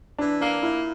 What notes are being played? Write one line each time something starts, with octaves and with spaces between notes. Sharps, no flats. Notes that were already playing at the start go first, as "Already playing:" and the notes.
E3 D4
A#3 D4
A#2 E4